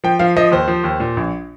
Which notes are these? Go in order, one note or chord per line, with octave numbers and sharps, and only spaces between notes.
F3 G5
F3 F5
F3 D#5
D#2 C5
F3
D#2
A#2
A#1